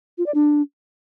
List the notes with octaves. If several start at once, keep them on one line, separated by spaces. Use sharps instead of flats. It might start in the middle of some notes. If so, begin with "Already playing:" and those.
F4
D5
D4